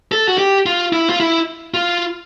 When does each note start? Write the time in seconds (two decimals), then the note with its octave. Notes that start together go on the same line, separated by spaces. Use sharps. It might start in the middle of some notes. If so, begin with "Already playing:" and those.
0.12 A4
0.28 F#4
0.38 G4
0.66 F4
0.93 E4
1.09 F4
1.20 E4
1.74 F4